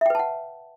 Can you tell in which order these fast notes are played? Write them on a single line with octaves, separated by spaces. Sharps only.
E5 G5 B4 A5 F#5